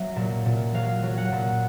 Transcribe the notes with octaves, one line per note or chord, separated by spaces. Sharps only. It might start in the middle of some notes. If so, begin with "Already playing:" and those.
Already playing: F#3 E5
A#2
A#2
F#3 F5
F#3
F#5
A#2